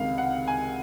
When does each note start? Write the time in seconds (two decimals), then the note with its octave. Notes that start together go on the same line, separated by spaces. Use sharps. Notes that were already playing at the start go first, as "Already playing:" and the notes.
Already playing: C#2 C3 D#3 F5
0.18 F#5
0.48 G#5